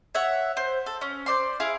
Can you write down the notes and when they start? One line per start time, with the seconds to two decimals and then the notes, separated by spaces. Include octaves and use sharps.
0.15 C#5 E5 F#5
0.57 C5
0.86 A4
1.01 C#4
1.26 C5 D5 C6
1.60 E4 G#4 F5